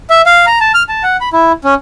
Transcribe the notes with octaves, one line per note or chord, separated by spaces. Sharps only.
E5
F5
A#5
A5
F6
A5
F#5
B5
E4
C#4